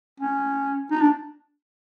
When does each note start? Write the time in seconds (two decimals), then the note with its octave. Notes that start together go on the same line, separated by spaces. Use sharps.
0.20 C#4
0.91 D#4
1.01 D4